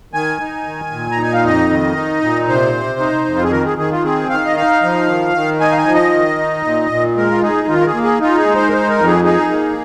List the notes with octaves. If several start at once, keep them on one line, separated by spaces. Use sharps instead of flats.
D#3 G#5
D#4
D#3
A#2
A#5
D#4 G#5
F5
F2 D#5
D#3
D#4
A#2
C3 C5
C3
D#4
F2
F4
G#4
D#3 A#4
G#4
D#3 G#4
F4
C4 G#4
D#3 F5
D#5
D#4 F5
F3
D#3
D#3
D#4 G#5
F5
G#5
F3
D#5
D#3
D#4
A#2
A#2
G#3 A#4
F4
D#4 G#4
D#3 F4
A#4
G#4
A#3
G#4
D#4 F4
G#4
G#3
C5
A#4
D#4 C5
A#4
F2
G#4
D#4 G#4
A#3